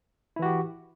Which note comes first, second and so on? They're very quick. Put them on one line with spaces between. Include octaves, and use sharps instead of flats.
E4 E3 F#4 G4